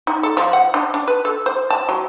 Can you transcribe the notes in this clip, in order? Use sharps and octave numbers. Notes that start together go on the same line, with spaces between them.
D#4
A4
F3
F#5
D4
D4
B4
A4
C5
A5
F#3